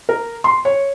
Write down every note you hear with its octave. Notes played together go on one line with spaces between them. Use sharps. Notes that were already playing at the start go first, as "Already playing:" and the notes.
A#4
C6
C#5